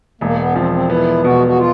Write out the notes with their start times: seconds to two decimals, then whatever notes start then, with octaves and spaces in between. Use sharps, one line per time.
0.21 E1 A#3
0.38 B3
0.51 C#4
0.56 F3 C4
0.72 C4
0.90 B3 E4
1.24 B2 F#4
1.47 F#4
1.58 F4